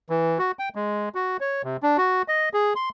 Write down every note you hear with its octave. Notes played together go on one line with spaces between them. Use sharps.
E3
F#4
G5
G#3
F#4
C#5
C3
D4
F#4
D#5
G#4
C6